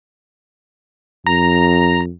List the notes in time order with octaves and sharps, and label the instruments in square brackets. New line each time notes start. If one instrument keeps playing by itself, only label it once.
[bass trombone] F2 [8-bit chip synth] A#5